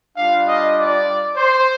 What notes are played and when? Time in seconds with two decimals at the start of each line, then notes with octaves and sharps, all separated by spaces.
0.17 G3 D4 F4 F5
0.47 D#5
0.77 D5
1.37 C5